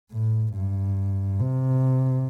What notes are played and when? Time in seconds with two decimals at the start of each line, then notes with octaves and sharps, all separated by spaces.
0.12 A2
0.54 G2
1.40 C3